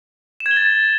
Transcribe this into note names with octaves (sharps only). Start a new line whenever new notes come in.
E7
G#6
G7
A6